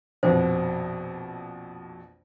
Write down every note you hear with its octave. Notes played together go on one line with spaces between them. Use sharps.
A#1 F2 B2 C5